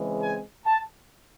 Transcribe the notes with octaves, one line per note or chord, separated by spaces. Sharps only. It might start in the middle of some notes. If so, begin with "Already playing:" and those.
Already playing: C#3 E3 G#3 C4
G#5
A5